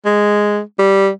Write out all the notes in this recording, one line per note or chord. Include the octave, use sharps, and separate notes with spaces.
G#3
G3